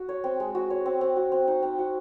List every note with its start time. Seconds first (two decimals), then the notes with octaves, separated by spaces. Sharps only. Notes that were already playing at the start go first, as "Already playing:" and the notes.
Already playing: F#4
0.09 C#5
0.24 C4
0.40 G#3
0.55 F#4
0.70 C#5
0.86 C4
1.01 C4
1.16 F#4
1.32 C4
1.48 D#4
1.62 C4
1.78 F#4